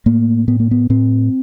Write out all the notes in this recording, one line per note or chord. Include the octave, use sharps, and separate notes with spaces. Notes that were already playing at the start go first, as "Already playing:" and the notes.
A2 A#3
A2 B3
A#3
B3
A2 C4